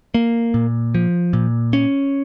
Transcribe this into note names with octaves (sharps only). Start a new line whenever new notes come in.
A#3
A#2
F3
A#2
C#4